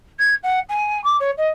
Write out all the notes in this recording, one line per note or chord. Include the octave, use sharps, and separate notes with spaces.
G#6
F#5
G#5
D6
C#5
D#5